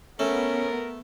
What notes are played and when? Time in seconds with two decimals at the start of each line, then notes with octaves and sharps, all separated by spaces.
0.19 A3 B3 C#4 A#4